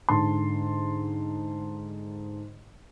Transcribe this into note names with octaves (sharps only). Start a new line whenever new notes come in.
G#2 D3 A5 C6